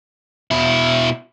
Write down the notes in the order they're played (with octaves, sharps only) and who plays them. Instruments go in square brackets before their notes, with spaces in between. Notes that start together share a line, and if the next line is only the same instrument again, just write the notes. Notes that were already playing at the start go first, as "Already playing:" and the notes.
[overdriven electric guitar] B2 E4